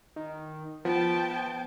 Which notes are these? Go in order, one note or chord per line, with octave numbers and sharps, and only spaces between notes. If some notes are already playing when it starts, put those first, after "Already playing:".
D#3
F3 B3 G5 A5